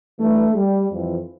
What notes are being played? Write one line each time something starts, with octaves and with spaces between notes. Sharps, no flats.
G2 E3 A3
G3
F2 E3